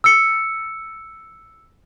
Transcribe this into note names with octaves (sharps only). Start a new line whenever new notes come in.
E6 C#7